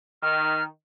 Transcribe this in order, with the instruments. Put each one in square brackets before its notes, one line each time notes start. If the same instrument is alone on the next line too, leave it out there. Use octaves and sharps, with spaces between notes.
[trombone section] D#3 [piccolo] F6